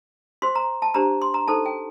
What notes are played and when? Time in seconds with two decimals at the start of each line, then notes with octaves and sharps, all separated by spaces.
0.42 F#4 C5 C6
0.55 A#5
0.82 A5
0.94 D4 G4 C5 A#5
1.22 C6
1.34 A#5
1.48 D#4 A4 C5 A5
1.66 G5